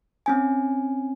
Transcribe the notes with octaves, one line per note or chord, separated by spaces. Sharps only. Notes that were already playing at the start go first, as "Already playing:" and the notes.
C4 C#4 G#5